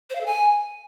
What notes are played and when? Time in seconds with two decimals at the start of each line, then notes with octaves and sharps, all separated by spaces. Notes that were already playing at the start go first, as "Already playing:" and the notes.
0.10 C5
0.15 F5
0.21 A4
0.26 G#5